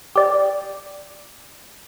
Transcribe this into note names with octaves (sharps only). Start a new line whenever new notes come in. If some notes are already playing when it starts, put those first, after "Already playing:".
G4 D5